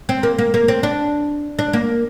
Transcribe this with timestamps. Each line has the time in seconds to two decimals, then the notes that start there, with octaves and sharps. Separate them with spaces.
0.09 C4
0.23 A#3
0.39 A#3
0.54 A#3
0.68 C4
0.83 D4
1.59 D4
1.73 A#3